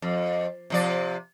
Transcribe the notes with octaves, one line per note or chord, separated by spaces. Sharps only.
F2
C3 F3 D5